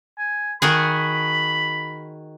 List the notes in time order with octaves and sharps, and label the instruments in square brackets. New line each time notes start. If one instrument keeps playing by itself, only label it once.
[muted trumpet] G#5
[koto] D#3 F#4 G#4 [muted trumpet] B5